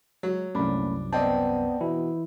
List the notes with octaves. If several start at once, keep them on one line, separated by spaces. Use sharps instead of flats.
F#3 G#3
C2 F#2 A#2 A3 C#4 D4 B5
B3 C4 D5 D#5 G5 A5
B2 E3 E4